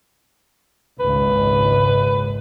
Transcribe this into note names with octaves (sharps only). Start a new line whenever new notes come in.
G#1 C#2 A#2 B4